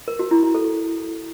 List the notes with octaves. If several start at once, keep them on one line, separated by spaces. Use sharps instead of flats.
A#4
F#4
E4
E4
A4